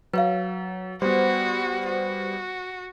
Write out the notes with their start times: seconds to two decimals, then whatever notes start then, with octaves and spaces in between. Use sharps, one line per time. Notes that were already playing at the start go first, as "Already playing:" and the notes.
0.13 F#3 B4 C#5 F5
1.02 G3 B3 F#4 C5
1.86 F#4